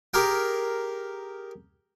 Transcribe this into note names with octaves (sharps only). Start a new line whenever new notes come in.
G4 G#4 A#4 G5